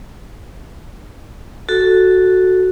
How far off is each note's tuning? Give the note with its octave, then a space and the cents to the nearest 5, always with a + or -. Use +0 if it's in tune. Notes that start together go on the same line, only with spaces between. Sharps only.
F#4 +0 A4 +0